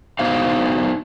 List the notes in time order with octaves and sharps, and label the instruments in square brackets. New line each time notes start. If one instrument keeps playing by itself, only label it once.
[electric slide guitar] B3 D#4 F#4 C5 F5